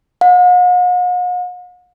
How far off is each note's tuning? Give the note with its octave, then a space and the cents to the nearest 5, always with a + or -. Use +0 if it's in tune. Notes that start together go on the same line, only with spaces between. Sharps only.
F#5 -45